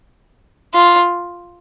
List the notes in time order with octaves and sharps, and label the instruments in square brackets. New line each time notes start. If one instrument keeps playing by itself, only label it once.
[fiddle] F4